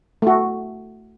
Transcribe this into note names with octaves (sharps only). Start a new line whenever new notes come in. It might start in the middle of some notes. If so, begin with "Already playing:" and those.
A3 F#4